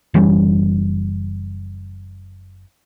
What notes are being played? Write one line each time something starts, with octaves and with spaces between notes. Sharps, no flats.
F#1 E3 G3 C#4